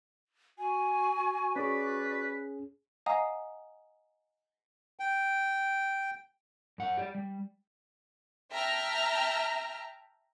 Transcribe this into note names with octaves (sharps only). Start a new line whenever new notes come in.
F#4 G#5
C#4 G#4 B4 D5
D#5 F5 F#5 G#5 A#5 D#6
G5
F#2 F#5
G4 D5
G3
E5 G5 A5 A#5 F6